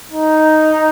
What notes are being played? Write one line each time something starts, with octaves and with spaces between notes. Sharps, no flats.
D#4